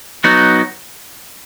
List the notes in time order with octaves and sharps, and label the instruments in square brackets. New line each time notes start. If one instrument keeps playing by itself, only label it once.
[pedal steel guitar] F#3 B3 D#4 F#4